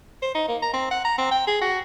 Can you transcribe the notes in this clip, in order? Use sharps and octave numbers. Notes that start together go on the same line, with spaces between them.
C5
D#4
A#3
A#5
C4
F#5
A#5
C4
G5
G#4
F#4